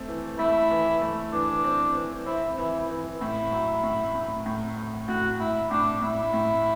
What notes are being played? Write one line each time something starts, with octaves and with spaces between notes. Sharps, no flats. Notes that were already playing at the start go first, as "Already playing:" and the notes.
Already playing: A3 C4
E3
A3 E4
E3
A3
E3 D4
C4
E3
C4 E4
E3 E4
E3
A2 E4
F#3
A2
A2
A2
A2
A2 F#4
A2 E4
A2 D4
A2 E4
A2